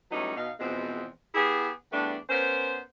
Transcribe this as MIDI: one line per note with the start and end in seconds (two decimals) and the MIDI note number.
0.11 0.36 45
0.11 0.36 54
0.11 0.36 55
0.11 0.36 59
0.11 0.36 61
0.11 0.36 63
0.36 0.51 47
0.36 0.51 63
0.36 0.51 77
0.60 1.06 40
0.60 1.06 47
0.60 1.06 53
0.60 1.06 56
0.60 1.06 60
1.35 1.71 59
1.35 1.71 64
1.35 1.71 67
1.35 1.71 68
1.93 2.17 40
1.93 2.17 55
1.93 2.17 57
1.93 2.17 59
1.93 2.17 62
2.30 2.80 59
2.30 2.80 61
2.30 2.80 70
2.30 2.80 72